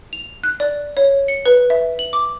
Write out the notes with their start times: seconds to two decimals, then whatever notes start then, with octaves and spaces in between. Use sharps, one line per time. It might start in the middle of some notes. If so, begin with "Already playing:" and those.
0.13 F7
0.43 F#6
0.60 D5
0.97 C#5
1.28 C#7
1.46 B4
1.70 E5
1.99 F#7
2.13 D6